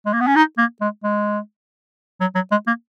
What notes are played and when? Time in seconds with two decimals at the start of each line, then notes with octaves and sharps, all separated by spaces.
0.06 G#3
0.13 A#3
0.21 B3
0.27 C#4
0.35 D#4
0.58 A#3
0.81 G#3
1.04 G#3
2.21 F#3
2.35 F#3
2.51 G#3
2.67 A#3